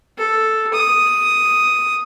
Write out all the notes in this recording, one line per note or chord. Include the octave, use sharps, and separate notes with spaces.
A4
D#6